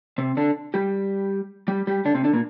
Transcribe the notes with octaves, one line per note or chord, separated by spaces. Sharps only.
C3 C4
D3 D4
G3 G4
G3 G4
G3 G4
D3 D4
C3 C4
D3 D4
A#2 A#3